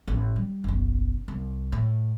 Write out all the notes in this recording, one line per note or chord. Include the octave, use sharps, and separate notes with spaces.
A1
G3
F#1 B1
C2
A2